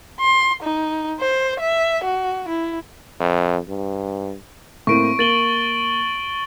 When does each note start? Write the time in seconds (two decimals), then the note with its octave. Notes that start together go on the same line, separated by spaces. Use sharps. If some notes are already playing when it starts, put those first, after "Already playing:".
0.20 C6
0.63 D#4
1.20 C5
1.60 E5
2.04 F#4
2.48 E4
3.20 F2
3.68 G2
4.87 A2 A#3 C4 C#6 D7
5.19 A#3 A6 F#7 G7